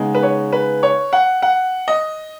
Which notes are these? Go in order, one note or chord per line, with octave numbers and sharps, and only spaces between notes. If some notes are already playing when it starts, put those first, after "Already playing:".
Already playing: C#3 G#3 B3 D#4
B4
C#5
B4
C#5
F#5
F#5
D#5